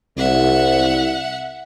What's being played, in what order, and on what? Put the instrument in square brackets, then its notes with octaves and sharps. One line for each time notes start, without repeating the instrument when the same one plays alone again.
[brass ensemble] C2 [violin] E5 F#5